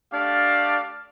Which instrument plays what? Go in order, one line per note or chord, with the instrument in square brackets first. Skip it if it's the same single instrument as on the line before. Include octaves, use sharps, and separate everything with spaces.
[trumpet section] A3 D4 G4 D5 F5